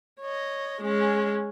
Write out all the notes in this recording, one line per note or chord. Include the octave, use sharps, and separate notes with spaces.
C#5 D#5
G#3 C#4